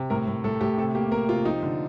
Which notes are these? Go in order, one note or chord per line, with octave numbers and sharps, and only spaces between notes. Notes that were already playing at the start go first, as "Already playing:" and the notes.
Already playing: C3
A2 A#4
A2
A2 A4
A2 G4
C3 A4
A#3 G4
A#3 A#4
C3 F4
F3 D#4
D3